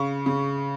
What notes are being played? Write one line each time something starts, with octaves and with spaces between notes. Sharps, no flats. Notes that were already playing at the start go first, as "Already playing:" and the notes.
Already playing: C#3 C#6
C#3